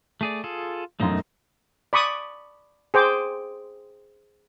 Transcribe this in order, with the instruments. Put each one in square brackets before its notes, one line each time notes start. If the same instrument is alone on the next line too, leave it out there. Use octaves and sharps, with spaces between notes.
[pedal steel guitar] A3 G#4 D5
F4 G#4 A4
[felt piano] E1 F#2 [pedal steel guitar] A3 D#4 D#5
[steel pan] D5 B5 C#6 D#6
G#4 C5 G5 D6